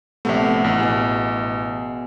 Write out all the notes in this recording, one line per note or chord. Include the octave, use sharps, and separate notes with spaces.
A#1 C3 A3 B3 E5
A1
B2 G#4